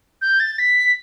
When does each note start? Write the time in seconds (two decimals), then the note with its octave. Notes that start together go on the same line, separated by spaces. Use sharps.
0.22 G6
0.40 A6
0.59 B6